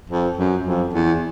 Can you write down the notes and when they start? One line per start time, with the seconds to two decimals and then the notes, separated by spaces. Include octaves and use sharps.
0.10 F2
0.37 F#2
0.65 F2
0.93 E2